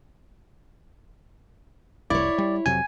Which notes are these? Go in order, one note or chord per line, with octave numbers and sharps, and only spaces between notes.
F1 C2 E4 C#5 D5
G3
F2 C3 F#3 G#5